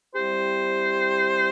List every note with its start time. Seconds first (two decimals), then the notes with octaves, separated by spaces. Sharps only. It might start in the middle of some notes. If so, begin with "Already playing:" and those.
0.15 G3 C4 E4 G4 C5